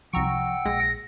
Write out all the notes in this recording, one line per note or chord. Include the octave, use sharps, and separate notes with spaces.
C2 F3 F#5 G5 A#5 C#6 E6
A#1 G#3 A#6